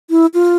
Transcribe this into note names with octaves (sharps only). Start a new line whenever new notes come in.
E4
F4